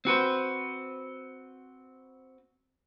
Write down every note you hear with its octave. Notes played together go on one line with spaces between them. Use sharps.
C4 F#4 B4 C5